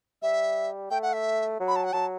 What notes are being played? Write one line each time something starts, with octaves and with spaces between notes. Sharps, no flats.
G3 E5
A3 G5
F#5
E5
F#3
B5
A5
F#5
F#3 A5